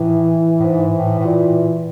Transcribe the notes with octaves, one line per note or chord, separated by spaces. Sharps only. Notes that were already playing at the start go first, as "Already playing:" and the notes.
Already playing: A2 E3
A2
G#2
A2
A2
A#2